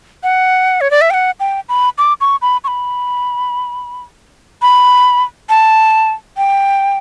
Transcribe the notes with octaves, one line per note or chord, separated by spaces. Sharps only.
F#5
C#5
D5
E5
G5
F#5
G5
B5
D6
C#6
B5
C#6
B5
B5
A5
G5